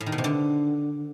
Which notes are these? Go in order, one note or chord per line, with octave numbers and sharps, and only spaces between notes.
A2
D#3
B2
C3
D3